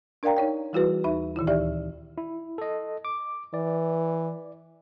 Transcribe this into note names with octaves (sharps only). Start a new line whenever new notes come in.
D4 A#4 D5 F5 G5 A#5
D#4 C#5 G5
E3 G3 E4 F#4 G#4 B4
D#2 D#4 E5 B5
A#2 D#3 E3 E4
D2 E3 D#4 G4 D5 E5
E4
A4 D#5
D6
E3 D5